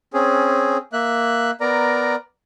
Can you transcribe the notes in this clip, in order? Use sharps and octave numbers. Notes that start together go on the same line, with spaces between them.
C4 C#4 G#4
A#3 E5 F#6
B3 A#4 D5 A#5